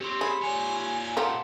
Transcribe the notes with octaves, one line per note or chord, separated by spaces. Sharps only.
C4 G4 C#5 C6
G#4 B5
A#2 C#5 G#5
F4 G4 A#4 F#5 A5